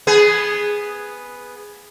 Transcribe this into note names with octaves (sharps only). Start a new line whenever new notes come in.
B3 G#4